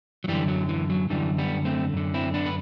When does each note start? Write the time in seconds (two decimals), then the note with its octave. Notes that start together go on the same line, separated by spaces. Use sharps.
0.24 F#3
0.28 F#2 D3 E3 G3
0.48 F#3
0.69 E3
0.90 F#3
1.10 F#2 D3 E3 G3
1.38 G3 B3
1.65 A3 C4
1.93 F#2 D3
2.14 C4 E4
2.34 B3 D4
2.46 B4